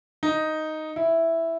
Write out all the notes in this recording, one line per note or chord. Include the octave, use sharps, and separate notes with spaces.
D#4
E4